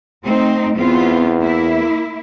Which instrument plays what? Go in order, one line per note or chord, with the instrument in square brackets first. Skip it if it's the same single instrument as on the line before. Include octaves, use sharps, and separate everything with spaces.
[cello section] A3 C4 D#4
[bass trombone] E2 [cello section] B3 C4 F4
[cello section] A#3 E4